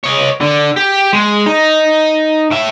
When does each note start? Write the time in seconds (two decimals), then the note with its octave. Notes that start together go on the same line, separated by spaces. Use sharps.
0.04 C#5 D#5
0.41 D3
0.76 G4
1.13 G#3
1.46 D#4
2.51 A2 E5